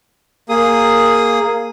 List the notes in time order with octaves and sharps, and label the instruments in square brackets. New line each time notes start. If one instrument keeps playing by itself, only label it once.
[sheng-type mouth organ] A#3 G#4 D#6